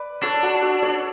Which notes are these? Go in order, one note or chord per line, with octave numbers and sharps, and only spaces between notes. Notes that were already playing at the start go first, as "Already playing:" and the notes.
Already playing: B4 D5
D4 A4 C#5
F#4 A4
F#4 A4
A4 C#5